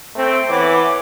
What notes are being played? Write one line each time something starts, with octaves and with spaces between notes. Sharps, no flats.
A3 C4
E3 B3 C#5 D6